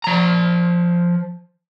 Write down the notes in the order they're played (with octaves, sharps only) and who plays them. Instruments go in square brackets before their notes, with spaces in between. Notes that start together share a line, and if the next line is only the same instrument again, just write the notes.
[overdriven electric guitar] F3 A#5